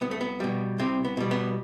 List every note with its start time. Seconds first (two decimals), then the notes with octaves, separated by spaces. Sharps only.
0.01 C2 B3
0.11 A3
0.21 B3
0.40 B2 G3
0.78 C2 C3 C4
1.05 B3
1.17 B2 G3
1.31 B3